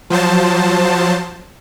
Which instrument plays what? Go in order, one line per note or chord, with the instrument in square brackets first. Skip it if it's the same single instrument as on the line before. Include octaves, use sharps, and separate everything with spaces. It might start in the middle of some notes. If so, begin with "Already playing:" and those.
[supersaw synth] F3 F#3 C5 A5